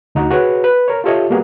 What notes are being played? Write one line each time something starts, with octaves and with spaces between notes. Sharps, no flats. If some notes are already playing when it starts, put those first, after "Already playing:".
D2 D#4 F#4
F#4 G#4 B4 C#5
B4
A#4 C#5
F4 G4 A4 C#5 D#5 E5
G3 A#3 B3 F#4 G#4